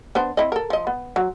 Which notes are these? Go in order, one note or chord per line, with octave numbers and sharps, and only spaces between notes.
B3 D4 C5
C4 E4 D#5
A4 A#4
F3 D#5
B3
F#3